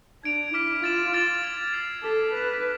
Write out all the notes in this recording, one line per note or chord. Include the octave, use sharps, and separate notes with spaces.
D4 G#6 D7 F7
E4 D6 F6 B6
F4 E6 A6 E7
D6 F6 A6 D7 F7
G#6 D7 F7
E6 A6 C7 F7
A4 D6 F6 B6 E7
B4 A6 E7